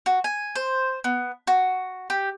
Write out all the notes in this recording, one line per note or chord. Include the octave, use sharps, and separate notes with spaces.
F#4
G#5
C5
B3
F#4
G4